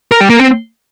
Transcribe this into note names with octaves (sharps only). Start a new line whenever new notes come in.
A#4
G3
A#3
C4